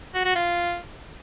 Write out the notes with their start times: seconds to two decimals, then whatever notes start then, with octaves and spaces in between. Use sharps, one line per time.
0.14 F#4
0.25 F#4
0.35 F4